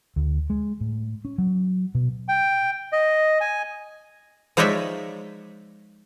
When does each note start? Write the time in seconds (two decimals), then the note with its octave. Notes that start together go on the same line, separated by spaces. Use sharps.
0.16 D2
0.50 G#3
0.81 A2
1.25 C#4
1.38 F#3
1.95 B2
2.29 G5
2.92 D#5
3.41 G#5
4.57 F3 G#3 D#4 C#5 D5 E5